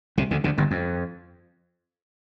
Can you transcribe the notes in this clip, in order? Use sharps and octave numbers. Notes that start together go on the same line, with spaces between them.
C2 C3
D2 D3
D2 D3
G1 G2
F2